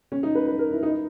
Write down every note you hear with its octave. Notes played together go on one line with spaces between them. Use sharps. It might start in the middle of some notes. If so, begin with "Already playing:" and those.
C#4
D#4
B4
B4
A#4
E4
D#4